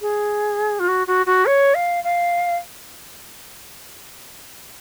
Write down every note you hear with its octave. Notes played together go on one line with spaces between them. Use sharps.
G#4
F4
F#4
F#4
F#4
C#5
F5
F5